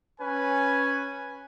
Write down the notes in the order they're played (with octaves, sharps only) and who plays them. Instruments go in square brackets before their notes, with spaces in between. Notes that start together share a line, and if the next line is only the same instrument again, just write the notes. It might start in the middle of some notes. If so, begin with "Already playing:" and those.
[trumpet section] C#4 B4 G#5